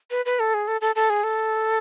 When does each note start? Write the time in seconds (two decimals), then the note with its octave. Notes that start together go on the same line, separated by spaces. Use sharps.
0.11 B4
0.25 B4
0.39 A4
0.54 G#4
0.68 A4
0.81 A4
0.95 A4
1.10 G#4
1.24 A4